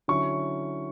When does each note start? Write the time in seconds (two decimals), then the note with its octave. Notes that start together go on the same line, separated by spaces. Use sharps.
0.08 D3 F#3 C#4 E4 C#6